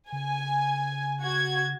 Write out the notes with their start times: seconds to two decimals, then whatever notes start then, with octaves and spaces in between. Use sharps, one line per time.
0.12 C#3 G#5
1.22 F#4 G#6